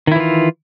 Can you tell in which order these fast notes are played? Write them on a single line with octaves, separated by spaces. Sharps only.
D#3 E4 E3 F4